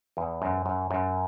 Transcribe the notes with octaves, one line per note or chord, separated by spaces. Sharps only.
E2
F#2
F#2
F#2